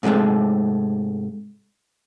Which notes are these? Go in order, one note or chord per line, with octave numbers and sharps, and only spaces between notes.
G#2 C3 F#3 G#3 A3